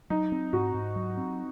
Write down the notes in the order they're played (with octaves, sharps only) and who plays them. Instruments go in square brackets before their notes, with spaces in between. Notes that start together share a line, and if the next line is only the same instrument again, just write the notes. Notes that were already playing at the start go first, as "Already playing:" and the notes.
[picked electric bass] F#3 [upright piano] D#4
[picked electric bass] C4
[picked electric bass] G#2 [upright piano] F#4
[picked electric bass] G#2
F#3
C4